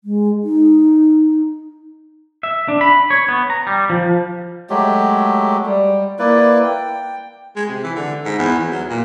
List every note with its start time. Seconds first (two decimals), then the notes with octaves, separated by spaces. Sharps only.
0.04 G#3
0.43 D#4
2.43 E5
2.68 D4
2.81 B5
3.10 C#5
3.29 B3
3.50 A#5
3.67 G3
3.90 F3
4.70 F#3 G#3 A3 G4
5.66 G3
6.19 A#3 E4 B4 D5
6.64 G5
7.56 G#3
7.69 C3
7.83 E3
7.95 D3
8.25 G#2
8.39 E2
8.59 E2
8.71 F#3
8.89 A#2